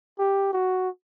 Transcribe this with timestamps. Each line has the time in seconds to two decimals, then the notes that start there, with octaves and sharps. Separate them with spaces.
0.19 G4
0.53 F#4